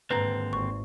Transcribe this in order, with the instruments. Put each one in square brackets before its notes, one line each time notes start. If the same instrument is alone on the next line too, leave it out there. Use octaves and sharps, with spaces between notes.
[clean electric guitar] D#2 D3 C4 [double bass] G#2 [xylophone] B4 A#5
[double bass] G#1 [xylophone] C#6